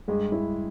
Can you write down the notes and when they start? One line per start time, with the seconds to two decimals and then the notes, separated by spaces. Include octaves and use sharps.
0.08 G2 G#3
0.32 E4